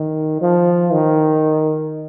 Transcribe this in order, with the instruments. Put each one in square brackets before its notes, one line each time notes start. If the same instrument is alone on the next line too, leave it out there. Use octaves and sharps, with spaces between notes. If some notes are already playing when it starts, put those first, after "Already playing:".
Already playing: [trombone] D#3
F3
D#3